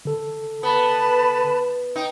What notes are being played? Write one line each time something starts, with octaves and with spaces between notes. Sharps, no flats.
D3 A4
B3 B4 A5 B5
D#4 G5